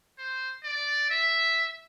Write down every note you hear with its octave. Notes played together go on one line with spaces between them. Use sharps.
C5
D5
E5